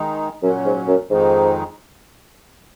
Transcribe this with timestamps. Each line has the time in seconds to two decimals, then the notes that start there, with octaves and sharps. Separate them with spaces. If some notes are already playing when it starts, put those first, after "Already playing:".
Already playing: D#3 G#3 D#4
0.42 F#2 A#2 F#3 C#4
0.65 G#2
0.88 F#2
1.09 F2 G#2 D#3 G#3 D#4